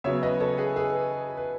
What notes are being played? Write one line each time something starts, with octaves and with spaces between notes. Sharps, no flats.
C#3 F#3 B3 C#5 E5
B4 D#5
A4 C#5
G#4 B4
G#4 B4
B4